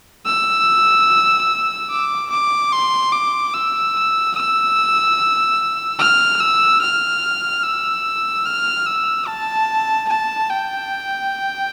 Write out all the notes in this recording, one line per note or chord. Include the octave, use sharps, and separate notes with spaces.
E6
D6
D6
C6
D6
E6
E6
F6
E6
F6
E6
F6
E6
A5
A5
G5